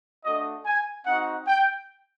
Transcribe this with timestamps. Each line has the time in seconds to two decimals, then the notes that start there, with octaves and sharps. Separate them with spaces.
0.25 A3 D4 F#4 D#5
0.66 G#5
1.06 C4 D#4 F#4 F#5
1.47 G5